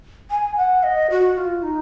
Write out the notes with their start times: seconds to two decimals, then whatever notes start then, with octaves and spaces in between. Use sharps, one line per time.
0.31 G#5
0.56 F#5
0.83 D#5
1.11 F#4
1.37 F4
1.63 D#4